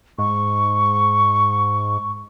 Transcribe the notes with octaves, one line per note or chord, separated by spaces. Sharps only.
G#2 C#6